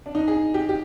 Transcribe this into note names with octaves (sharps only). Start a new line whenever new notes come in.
D4
D#4
G#4
G4
G4